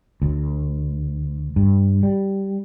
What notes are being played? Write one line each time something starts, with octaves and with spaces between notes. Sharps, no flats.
D2
G2
G3